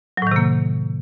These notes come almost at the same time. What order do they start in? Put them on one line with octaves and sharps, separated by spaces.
F#3 A2 D#3 C3 A#3